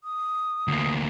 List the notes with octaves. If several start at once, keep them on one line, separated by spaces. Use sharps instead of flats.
D#6
D2 A#3